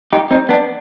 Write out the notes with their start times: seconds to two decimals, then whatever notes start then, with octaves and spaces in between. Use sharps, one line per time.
0.13 D#4 G4
0.31 C4 D#4
0.49 B3 D4